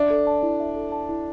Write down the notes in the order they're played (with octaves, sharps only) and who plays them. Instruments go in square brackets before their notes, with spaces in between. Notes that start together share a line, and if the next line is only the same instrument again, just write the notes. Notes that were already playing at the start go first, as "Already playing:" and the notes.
Already playing: [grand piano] D4 [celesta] E5
[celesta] A4
A5
E4
E5
A4
A5
E4